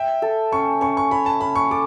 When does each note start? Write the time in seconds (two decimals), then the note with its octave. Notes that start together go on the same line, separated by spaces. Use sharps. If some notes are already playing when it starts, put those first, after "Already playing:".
Already playing: E5 G5
0.22 A4
0.52 C#4 C#6
0.81 C#4 C#6
0.97 C#6
1.11 C#5 B5
1.26 A5
1.41 C#4 B5
1.56 C#6
1.71 A4 D6